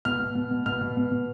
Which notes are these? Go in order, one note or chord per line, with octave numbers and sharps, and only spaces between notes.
B2 F6
B2
B2
B2
B2 F6
B2
B2
B2